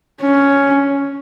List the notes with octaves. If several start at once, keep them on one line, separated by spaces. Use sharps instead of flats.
C#4